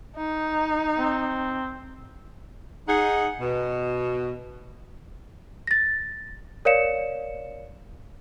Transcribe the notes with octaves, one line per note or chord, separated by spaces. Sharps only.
D#4
C4
D#4 G#4 F#5
B2
A6 A#6
A#4 C#5 D5 F5 C#7 E7